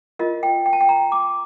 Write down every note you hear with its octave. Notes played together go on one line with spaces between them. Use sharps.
F4 A#4 D#5
G5
G5
A5
G5
A#5
D6